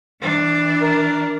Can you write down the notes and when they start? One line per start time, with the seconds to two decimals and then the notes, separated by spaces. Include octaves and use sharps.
0.21 E3 D4
0.82 A#4